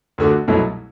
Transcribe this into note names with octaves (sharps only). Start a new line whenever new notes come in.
D2 D3 A3 D4 F#4
C2 B2 F#3 A3 E4